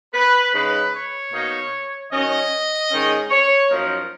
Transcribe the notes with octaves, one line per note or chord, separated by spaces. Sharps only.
B4
C#3 G#3 D#4 B4
C#5
B2 A#3 D#4
D#3 F#3 C#4 D#5
G#2 D#3 G#3 C#4
C#5
F#2 F3 A#3 D#4 A#4